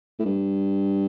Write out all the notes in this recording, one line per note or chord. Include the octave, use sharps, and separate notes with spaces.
A2
G2